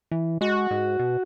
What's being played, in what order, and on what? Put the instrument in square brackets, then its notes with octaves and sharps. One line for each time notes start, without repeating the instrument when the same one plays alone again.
[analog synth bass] E3
[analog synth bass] G#3 [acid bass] F#4
[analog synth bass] G#2
B2